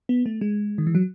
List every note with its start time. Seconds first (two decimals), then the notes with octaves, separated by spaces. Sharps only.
0.09 B3
0.26 A3
0.41 G#3
0.78 D#3
0.87 E3
0.95 F#3